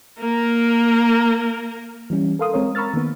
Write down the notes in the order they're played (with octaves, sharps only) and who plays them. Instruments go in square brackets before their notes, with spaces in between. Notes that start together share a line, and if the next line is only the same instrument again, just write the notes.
[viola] A#3 A#4
[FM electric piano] E3 G3 C#4
A4 A#4 F5 C6 D#6
G#3 C4 A#4 C#5
A#5 B5 C#6 E6 F6 A6
D#3 A#3 B3